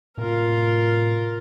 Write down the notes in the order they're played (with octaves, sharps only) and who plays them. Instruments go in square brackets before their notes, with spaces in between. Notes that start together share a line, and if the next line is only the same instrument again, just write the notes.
[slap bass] A2 C3 A#3 [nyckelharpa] F4 A#4